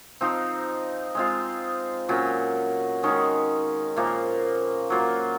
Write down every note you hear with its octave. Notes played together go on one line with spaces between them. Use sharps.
F3 C4 D#4
G#3 C4 F4
A#2 F#3 C#4
D#3 G#3 C#4
A#2 F3 A#3
F#3 A#3 F4